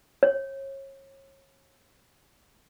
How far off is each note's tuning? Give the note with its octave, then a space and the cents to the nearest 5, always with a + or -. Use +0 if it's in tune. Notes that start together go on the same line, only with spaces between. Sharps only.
C#5 -30